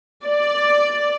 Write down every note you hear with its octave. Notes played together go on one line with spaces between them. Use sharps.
D5